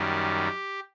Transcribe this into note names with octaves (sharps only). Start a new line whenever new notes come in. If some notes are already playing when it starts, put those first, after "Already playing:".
Already playing: F#2 D#3 G3 G4